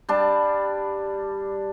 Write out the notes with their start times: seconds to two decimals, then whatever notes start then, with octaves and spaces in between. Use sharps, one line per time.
0.09 G3 D4 A5